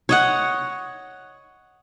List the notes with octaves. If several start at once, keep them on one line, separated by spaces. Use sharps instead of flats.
C#5 D#5 F#5